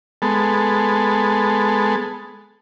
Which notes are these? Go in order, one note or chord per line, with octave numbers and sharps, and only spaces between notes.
G#3 B3 A4